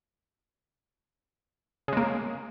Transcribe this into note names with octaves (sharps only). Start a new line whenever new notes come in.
C#3 G#3 A#3